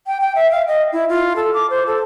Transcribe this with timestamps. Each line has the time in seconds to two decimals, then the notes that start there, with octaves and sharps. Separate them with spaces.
0.07 G5
0.20 G5
0.35 E5
0.51 F5
0.67 D#5
0.92 E4
1.09 F4
1.36 A4
1.54 D6
1.70 C5
1.87 A4